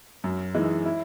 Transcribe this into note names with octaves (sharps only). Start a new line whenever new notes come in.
F#2
E3 G#3 D#4
E4